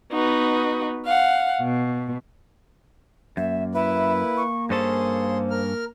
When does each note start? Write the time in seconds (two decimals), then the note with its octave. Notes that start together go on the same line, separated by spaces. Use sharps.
0.13 B3 D#4 F#4 B4
1.06 F5 F#5
1.61 B2
3.37 F#2 A#3 E5
3.75 E4 B4 E5
4.37 C#6
4.70 G2 C#4 G#4 A4 C5 C6
5.51 A#4 F6